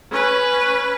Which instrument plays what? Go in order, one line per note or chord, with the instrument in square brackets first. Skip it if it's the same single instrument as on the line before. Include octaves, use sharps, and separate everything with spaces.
[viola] C#4 B4